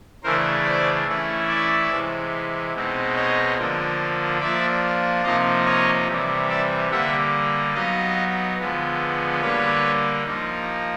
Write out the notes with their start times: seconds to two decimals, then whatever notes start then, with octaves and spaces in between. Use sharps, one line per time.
0.24 C#3 E3 A3 D4 A#4 C5
0.65 C5 D5
1.07 E3 A3 C#4 E4
1.49 D5 E5
1.91 C3 E3 G#3
2.73 B2 G#3 C4 D#4
3.16 C#5 D#5
3.58 D3 F3 A#3 D4
4.40 F3 A#3 D4 D5 E5
5.24 C3 F3 A#3 D#4 D#5 F5
5.66 C#5 D#5
6.08 C3 E3 G3
6.49 D5 E5
6.91 D3 G3 A#3 E5 F#5
7.74 F#3 B3 D#4 D#5 F5
8.58 D3 F3 G#3 B3
9.41 D3 G3 A#3 B4 C#5
10.24 F3 A#3 D#4